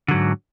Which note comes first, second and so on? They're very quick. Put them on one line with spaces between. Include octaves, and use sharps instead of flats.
D3 F#3 G#2